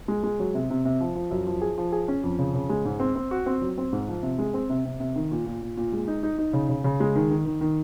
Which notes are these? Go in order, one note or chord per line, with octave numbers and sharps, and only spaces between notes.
G#3
G#3
F#3
C3
C3
C3
F3
F3
F#2
F3
G#4
F3
G#4
C#4
F2
C#3
C#3
G#3
G#2
C4
C4
F#4
C4
F#3
C4
G#2
F3
C3
G#3
C4
C3
C3
C3
D#3
A#2
A#2
A#2
A#2
G#3
D#4
D#4
D#4
C#3
C#3
C#3
G#3
D#3
D#3
D#3
D#3